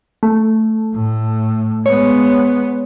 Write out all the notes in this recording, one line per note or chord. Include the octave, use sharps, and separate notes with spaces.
A3
A2
G#3 B3 C#5